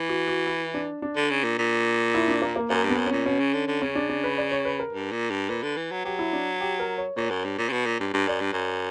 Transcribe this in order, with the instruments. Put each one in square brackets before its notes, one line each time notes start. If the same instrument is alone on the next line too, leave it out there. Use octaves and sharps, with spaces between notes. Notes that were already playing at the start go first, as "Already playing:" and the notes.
Already playing: [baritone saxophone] E3
[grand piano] F#4
F#4
E4
D4
D4
[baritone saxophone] D3
C#3
A#2
A#2
[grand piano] E4
D4
A#3
A#3
[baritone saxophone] F#2 [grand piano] A#3
[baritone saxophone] G2 [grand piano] B3
[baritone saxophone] F#2
[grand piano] C#4
[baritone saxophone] A#2
[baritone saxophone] B2 [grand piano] C#4
[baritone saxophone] C#3
D3
D3
[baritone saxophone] C#3 [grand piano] C#4
[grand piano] D4
D4
B4
D5
C#5
B4
A#4
[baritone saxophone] G2
A#2
G2
[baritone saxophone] A#2 [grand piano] B4
[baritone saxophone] D3
E3
F#3
[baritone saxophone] F#3 [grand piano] G4
[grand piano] E4
D4
G4
A#4
C#5
[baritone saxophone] A#2 [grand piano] C#5
[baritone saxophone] F#2
G2
A#2
C#3
B2
A#2
G2
G2
[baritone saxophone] F#2 [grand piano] D5
[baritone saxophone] G2
F#2